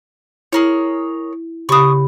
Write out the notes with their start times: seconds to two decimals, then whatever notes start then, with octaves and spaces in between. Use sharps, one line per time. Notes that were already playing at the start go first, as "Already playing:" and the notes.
0.53 E4 G#4 A#4 C#5
1.69 C#3 G4 B5 C#6 D#6